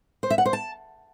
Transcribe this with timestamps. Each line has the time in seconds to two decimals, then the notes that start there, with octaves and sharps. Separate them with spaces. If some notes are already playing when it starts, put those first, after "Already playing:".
0.23 C5
0.30 E5
0.38 F#5
0.46 C5
0.53 A5